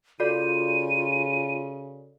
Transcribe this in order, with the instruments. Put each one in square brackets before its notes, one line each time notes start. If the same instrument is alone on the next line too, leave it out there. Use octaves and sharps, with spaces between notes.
[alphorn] C#3 [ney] F4 [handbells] F#4 A4 D5 [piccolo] D#7